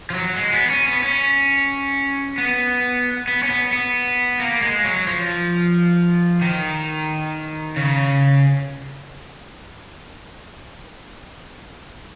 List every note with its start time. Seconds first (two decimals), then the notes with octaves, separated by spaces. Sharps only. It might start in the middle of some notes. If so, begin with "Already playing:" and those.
0.10 F3
0.14 F#3
0.36 G#3
0.53 B3
0.70 C#4
0.87 B3
1.03 C#4
2.38 B3
3.28 B3
3.43 C#4
3.50 B3
3.73 B3
4.40 A#3
4.62 G#3
4.85 F#3
5.07 F3
6.41 D#3
7.76 C#3